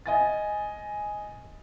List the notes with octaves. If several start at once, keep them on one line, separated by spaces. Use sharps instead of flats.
D#5 G#5 A6